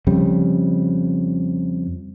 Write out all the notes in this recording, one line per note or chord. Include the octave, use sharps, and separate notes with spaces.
F2 C#3 G3